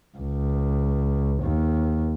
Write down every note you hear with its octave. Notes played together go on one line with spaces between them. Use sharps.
C#2
D#2